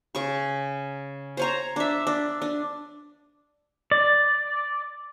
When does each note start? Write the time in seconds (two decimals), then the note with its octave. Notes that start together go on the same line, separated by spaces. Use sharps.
0.15 C#3 C#6
1.37 C5 C#5 A#5
1.76 D4 E5
2.07 D4
2.42 D4
3.92 D5